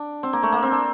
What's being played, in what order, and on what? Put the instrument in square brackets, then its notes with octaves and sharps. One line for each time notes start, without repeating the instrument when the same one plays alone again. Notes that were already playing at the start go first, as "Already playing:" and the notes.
Already playing: [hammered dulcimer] D4
C4
A#3
A3
A#3
C4
D4